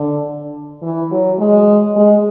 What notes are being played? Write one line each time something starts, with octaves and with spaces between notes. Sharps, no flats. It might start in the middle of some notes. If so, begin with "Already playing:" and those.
Already playing: D3
E3
F#3
G#3
G#3